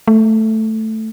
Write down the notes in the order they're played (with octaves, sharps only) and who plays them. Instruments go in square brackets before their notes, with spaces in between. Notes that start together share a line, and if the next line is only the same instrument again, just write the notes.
[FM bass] A3